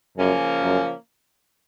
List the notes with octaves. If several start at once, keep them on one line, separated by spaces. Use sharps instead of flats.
F#2 C#3 F3 A#3 C#4
F#2